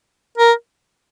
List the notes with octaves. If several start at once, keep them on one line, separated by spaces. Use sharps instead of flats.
A#4